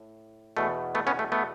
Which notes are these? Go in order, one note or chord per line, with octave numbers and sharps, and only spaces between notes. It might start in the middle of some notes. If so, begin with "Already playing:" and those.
Already playing: A2
E2 B2 A3
A3 B3
B3 C#4
A3
A3 B3